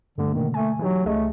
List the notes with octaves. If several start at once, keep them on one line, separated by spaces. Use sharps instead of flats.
G2 D3 A3
B2 D3 D#3 A#3
A3 G#5
E3 F#3 D#4 G4
C#2 A3 G#4 D#5